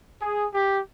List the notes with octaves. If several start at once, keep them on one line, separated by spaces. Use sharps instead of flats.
G#4
G4